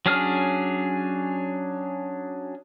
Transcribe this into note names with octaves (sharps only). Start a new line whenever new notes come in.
F#3 C#4 D4 G#4 F6